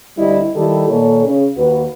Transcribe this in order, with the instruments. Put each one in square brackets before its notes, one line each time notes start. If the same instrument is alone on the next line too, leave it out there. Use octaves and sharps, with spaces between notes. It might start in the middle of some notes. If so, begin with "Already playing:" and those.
[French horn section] D2 G3 C4 E4 D#5
D#3 G3 E4 G4 A4
A#2 D#3 A#3 A4 C#5
C#3
D#2 F#4 B4